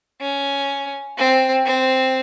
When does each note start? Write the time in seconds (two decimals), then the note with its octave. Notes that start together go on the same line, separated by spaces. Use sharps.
0.21 C#4
1.18 C4
1.66 C4